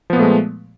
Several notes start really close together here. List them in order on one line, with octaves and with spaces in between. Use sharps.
F3 B3 A#2 A3 G#3